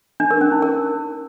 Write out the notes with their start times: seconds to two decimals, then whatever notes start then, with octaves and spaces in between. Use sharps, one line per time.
0.20 D4
0.31 A#4
0.41 C#4
0.52 D#4
0.62 A#4